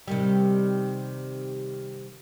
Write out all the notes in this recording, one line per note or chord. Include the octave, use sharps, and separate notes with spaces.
C3 D#3 G3